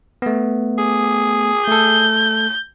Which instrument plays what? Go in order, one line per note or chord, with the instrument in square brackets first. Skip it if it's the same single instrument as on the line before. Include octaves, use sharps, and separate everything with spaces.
[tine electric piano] A3 B3
[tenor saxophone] G#4
[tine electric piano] A3 A4 [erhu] G6